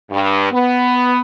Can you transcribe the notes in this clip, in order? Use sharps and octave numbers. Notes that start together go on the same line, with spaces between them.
G2
B3